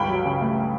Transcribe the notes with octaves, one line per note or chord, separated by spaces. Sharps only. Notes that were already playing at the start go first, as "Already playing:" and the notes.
Already playing: G1 C#2 G5 B5
F#3
C#3
A3